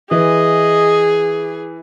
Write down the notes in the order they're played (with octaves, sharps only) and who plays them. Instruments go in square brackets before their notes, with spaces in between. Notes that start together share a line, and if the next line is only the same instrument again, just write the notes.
[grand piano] E3 [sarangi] G#4 [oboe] D#5